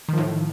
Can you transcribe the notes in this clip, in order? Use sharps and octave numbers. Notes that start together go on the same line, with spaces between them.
A2 D#3 F3